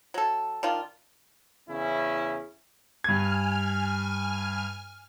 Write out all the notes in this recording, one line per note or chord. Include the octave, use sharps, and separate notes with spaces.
F#3 A4
D#3 D4 F4
E2 C#3 C#4 E4
G2 G#5 F6 G#6